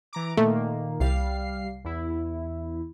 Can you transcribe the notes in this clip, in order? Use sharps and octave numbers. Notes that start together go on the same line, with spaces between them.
E3 A#5 D6
A#2 D#3 A3 A#3
C2 G3 F5 C7
E2 E4